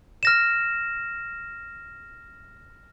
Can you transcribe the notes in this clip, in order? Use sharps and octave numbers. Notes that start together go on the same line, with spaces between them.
F6 A#6 E7